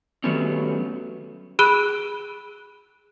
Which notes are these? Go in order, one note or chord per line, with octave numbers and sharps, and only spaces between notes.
D#3 F#3 G3 A3 B3 C#4
G#4 B5 E6 F#6 D7 G7